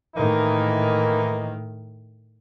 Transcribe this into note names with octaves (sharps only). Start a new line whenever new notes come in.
A2 D#3 E3 A#3 D#4